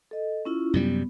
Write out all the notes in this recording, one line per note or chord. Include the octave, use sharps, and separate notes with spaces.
A4 D#5
C#4 E4 F4
F#2 C3 G3 B3